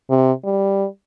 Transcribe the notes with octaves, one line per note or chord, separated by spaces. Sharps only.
C3
G3